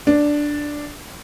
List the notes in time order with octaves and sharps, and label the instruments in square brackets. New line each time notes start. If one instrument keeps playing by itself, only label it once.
[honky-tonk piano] D4